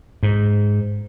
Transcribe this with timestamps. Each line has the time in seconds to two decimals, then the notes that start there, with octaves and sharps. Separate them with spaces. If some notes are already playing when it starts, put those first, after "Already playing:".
0.23 G#2